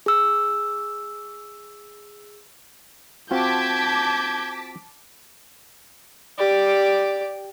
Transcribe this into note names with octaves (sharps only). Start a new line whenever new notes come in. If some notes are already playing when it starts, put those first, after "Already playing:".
G#4 E6
C4 F4 F#4 A5 D6 G6 G#6 B6
G4 D5